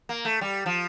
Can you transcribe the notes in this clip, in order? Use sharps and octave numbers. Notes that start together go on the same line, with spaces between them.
A#3
A3
G3
F3